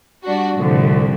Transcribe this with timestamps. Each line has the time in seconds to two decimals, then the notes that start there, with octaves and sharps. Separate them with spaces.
0.23 G3 D4 F#4
0.57 C2 A2 D3 F3